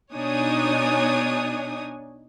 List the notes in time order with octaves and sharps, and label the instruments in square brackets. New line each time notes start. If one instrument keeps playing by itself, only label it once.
[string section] B2 D4 D#4 C#5 G#5 D#6